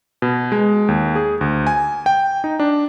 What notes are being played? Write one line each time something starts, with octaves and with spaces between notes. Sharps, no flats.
B2
G#3
D#2
G#4
D2
G#5
G5
D#4
D4